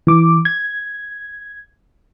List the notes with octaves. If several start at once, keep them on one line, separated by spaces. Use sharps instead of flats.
E3 D6
G#6